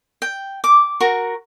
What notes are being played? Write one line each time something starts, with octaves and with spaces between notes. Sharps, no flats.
G5
D6
F#4 A#4 C#6